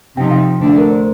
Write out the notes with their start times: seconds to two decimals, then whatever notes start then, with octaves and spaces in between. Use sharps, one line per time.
0.17 C3 F3 C4 D#4 G5
0.31 F5
0.60 D2 D3 A3 D4
0.78 A#4
0.91 C5